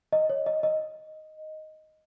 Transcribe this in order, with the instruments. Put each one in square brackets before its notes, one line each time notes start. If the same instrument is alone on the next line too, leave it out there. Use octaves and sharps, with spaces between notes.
[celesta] D#5
C#5
D#5
D#5